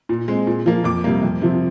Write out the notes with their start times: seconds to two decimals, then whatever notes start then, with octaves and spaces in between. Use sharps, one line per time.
0.09 A#2
0.28 G#3 C4
0.47 A#2
0.66 F3 A#3
0.84 F2 D6
1.04 C3 G3 A#3
1.23 F2
1.42 C3 F3 C4